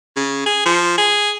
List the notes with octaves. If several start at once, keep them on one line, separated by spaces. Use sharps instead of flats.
C#3
G#4
F3
G#4